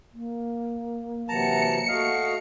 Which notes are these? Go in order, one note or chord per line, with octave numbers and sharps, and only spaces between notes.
A#3
C3 E3 F#3 A5 A#5 C#7
A3 F#4 D#5 F5